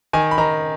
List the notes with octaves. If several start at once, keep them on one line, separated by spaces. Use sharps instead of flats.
D#3 G#5
B5
D#3 A#5